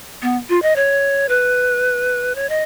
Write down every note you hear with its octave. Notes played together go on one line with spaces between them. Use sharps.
B3
F4
D#5
C#5
B4
C#5
D#5